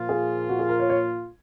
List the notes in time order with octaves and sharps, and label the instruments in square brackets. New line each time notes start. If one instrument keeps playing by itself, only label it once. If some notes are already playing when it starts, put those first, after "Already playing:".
Already playing: [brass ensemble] A#2 F3 A#3 F4
[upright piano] G#4
F#4
G#4
A#4
C#5
C#5